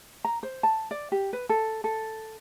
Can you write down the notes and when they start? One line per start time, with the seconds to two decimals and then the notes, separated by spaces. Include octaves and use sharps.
0.25 A#5
0.43 C5
0.63 A5
0.91 D5
1.12 G4
1.33 B4
1.49 A4
1.84 A4